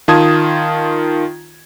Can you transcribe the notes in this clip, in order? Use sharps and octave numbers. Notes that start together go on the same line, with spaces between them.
D#3 F4 A5 D#6 G#6